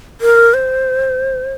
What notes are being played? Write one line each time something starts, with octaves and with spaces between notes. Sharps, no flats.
A#4
C5